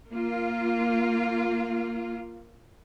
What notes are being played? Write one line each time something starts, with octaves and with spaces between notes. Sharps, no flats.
A#3 F4